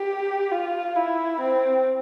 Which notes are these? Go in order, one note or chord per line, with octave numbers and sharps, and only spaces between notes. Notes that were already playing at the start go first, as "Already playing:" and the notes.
Already playing: G4
F4
E4
C4